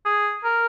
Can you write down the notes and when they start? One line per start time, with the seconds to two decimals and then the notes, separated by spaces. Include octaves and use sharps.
0.06 G#4
0.44 A#4